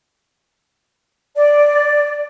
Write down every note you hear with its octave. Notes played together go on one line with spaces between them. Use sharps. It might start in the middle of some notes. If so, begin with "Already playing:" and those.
D5